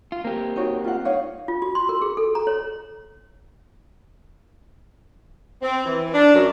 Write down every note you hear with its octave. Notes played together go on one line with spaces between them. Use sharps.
F4
A#3 C4 G4
D#4 F#4 C#5
F4 F#5
D#4 C#5 F5
F4
F#4
C6
A#4
G#4
A4
A#5
C#5
C4
E3
D4
F#2